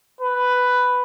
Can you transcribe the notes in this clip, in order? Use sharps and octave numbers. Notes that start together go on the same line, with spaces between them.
B4